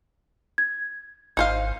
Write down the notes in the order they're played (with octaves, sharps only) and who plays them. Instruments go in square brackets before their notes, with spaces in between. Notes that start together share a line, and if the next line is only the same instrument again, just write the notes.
[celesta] G#6
[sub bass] G#1 [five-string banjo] D#4 C5 F5